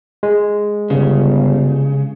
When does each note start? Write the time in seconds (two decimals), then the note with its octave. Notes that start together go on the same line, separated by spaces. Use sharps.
0.23 G#3
0.90 G1 C#3